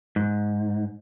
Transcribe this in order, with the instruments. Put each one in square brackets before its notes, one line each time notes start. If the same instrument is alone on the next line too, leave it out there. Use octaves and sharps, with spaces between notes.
[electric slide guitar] G#2